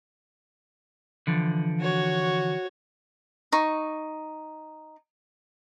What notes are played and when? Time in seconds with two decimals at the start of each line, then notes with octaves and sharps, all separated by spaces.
1.27 D3 E3 F3
1.80 F#4 C#5
3.52 D#4 C#6